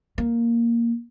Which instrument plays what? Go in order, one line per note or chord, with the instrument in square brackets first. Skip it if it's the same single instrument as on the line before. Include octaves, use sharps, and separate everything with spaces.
[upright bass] A#3